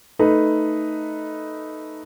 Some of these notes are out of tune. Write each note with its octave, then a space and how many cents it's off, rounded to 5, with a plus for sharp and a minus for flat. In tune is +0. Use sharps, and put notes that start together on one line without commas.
A3 +0 D#4 +0 B4 +0